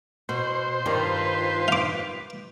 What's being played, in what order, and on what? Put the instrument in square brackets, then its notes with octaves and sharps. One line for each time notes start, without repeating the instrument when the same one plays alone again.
[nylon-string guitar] B2 [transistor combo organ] C5
[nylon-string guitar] G2 D#3 G3 [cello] F4 B4
[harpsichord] F5 D6